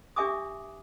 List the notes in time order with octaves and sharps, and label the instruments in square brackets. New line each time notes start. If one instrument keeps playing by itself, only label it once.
[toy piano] D4 G4 E5 G#5 D6 D#6